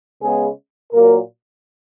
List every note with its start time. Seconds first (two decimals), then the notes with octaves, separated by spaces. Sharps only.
0.22 C#3 G#3 B3 G#4
0.93 A#2 F#3 A#3 A#4